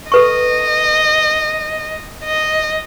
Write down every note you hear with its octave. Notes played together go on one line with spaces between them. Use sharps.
A4 B4 D#5 C#6
D#5